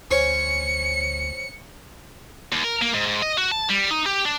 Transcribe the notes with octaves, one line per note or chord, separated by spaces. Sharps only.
D2 C#4 C5 C#5 C#7
D#2
A#4
A#3
G#2
G#2
D#5
F#4
A5
G3
D#4
G4
D4